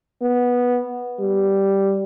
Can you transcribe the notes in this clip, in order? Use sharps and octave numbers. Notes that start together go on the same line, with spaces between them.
B3
G3